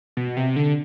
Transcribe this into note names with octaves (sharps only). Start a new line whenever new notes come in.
B2
C3
D3